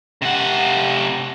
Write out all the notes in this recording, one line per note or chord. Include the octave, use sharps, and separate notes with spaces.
C3 F#5